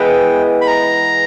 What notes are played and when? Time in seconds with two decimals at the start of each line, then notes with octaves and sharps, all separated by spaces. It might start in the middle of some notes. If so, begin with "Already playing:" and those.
Already playing: E3 G#3 B3 G5
0.61 B5
0.67 A#5